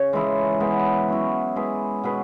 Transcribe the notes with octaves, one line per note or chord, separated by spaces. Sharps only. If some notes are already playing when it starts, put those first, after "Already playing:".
Already playing: C#3 C#4
E3 G#3 E4 G#4
G#3 B3 G#4 B4
F#3 C#4 E4
G#3 E4 G#4 B4
B2 B3 G#4 B4